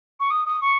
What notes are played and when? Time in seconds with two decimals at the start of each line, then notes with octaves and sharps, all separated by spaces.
0.19 C#6
0.30 D#6
0.45 D#6
0.61 C#6